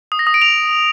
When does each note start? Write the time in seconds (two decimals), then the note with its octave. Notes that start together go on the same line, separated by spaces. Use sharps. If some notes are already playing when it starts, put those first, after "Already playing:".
0.12 D#6
0.19 A#6
0.27 D#6
0.34 D7
0.42 F7